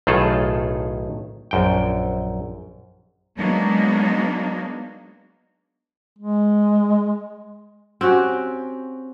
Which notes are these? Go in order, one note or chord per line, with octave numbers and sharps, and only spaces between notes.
B1 A2 D#3 F4 G#4 A4
A#1 F#2 G5
F#3 G#3 A#3 B3 D4 D#4
G#3
C4 C#4 F#4 G4